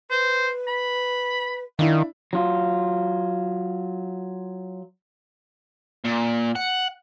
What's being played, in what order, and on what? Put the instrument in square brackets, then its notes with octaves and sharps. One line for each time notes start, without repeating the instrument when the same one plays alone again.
[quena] B4 [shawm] C5
[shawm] B5
[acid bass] D#3 [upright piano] D4 E4 [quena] F5
[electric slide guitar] F#3 F4
[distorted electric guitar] A#2
F#5